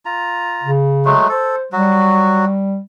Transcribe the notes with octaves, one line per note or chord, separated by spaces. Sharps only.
F4 A#5
C#3
F#3 G#3 A3
A4 C5
F#3 G3 F#4